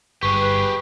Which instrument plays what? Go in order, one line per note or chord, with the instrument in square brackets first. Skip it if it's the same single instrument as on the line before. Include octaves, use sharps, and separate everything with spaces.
[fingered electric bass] G1 G2 [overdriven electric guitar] G4 G#4 [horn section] B4 [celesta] C#6